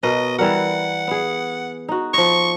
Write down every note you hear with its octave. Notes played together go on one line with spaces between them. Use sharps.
B2 A#4 D#5 F#5
E3 G3 A#4 F#5
B3 G#4
D#4 F#4
F3 D#5 C#6